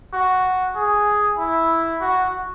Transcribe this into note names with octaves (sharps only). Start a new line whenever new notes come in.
F#4
G#4
E4
F#4